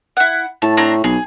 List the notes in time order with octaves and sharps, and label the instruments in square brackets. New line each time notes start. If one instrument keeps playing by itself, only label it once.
[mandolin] E4 F#5
[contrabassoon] A2 [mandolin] A5
[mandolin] C4 D4 A#5
[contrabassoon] B1 [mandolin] G#4